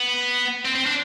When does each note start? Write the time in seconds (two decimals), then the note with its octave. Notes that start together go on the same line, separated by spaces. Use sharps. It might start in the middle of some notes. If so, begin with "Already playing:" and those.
Already playing: B3
0.65 C4
0.76 C4
0.86 D4